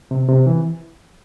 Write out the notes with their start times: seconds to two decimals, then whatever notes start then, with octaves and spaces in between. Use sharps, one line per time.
0.11 C3
0.29 C3
0.47 E3